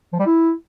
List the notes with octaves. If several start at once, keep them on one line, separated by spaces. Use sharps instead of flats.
F3
G3
E4